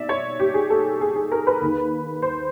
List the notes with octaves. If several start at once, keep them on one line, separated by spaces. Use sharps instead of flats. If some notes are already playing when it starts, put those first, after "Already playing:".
Already playing: B2 D5 E5
C#5
G4
G#4
A4
G#4
G#4
A#4
B4
D#2 D#3
C5